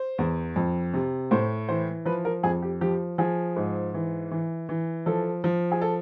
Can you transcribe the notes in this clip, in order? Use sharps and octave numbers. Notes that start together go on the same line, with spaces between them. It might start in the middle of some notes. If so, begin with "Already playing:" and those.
Already playing: C5
E2
F2
C3
A2 C5
E3 C5
F3 B4
A#4
F2 G#4
G4
F3 G4
F3 G#4
G#2
E3
E3
E3
F3 A4
F3
G#4
A4